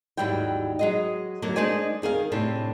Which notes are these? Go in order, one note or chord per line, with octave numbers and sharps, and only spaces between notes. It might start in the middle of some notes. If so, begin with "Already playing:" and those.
D#2 G#2 F#3 G3 E4 G5
F#3 G#3 D#5
D3 F#3 A#3
G#3 D4 D#4 C5 D5 G#5
D#3 G#4 A#4 F5
A2 C3 D4